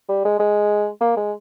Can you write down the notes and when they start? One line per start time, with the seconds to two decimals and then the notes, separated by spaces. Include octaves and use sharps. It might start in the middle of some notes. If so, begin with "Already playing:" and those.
0.09 G3
0.25 G#3
0.40 G#3
1.01 A#3
1.17 G#3